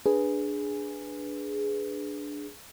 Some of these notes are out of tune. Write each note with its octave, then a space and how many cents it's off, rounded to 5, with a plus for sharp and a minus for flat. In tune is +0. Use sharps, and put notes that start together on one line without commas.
D4 +0 G#4 +0 B4 +0